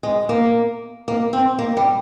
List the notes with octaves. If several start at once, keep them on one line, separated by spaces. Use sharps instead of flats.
G#3
A#3
A#3
C4
A#3
G3